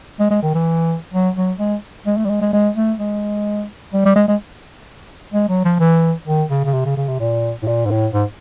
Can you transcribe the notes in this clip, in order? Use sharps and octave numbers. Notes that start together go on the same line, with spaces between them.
G#3
G#3
D#3
E3
F#3
F#3
G#3
G#3
A3
G3
G#3
G#3
G#3
A3
G#3
G3
G3
G#3
G#3
G#3
F#3
F3
E3
D#3
C#3
C#3
C3
C#3
C#3
C3
A#2
A2
A#2
G#2
A2
G#2